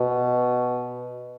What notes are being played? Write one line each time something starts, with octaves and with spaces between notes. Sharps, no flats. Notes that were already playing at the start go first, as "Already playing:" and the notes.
Already playing: B2